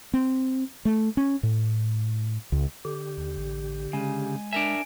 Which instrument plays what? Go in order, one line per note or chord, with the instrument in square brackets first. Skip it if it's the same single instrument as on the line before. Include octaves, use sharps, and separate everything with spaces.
[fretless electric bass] C4
A3
C#4
A2
C#2
[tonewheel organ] D3 G4
[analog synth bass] D#2
A1
[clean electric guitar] C#3 [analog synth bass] G#3 [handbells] G#5
[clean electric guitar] D4 A#4 E5 [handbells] G#5 D7